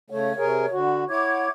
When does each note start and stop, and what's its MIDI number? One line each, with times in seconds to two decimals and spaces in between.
0.10 0.33 49
0.10 0.33 57
0.10 0.77 73
0.38 0.66 48
0.38 0.66 68
0.38 0.66 70
0.72 1.05 50
0.72 1.05 66
1.09 1.48 64
1.09 1.48 73
1.09 1.50 78
1.09 1.50 86
1.09 1.50 92